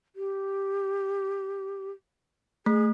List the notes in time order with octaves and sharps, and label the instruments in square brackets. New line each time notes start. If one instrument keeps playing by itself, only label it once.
[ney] G4
[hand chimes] A3 [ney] G#4